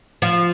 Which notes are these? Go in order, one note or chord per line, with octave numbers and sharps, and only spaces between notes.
F3